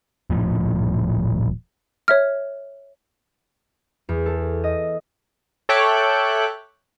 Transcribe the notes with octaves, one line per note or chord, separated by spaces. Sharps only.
D#1 A2 F3
C#5 E5 F6
E2
A4
D#5
A4 C#5 E5 G5 D6 F#6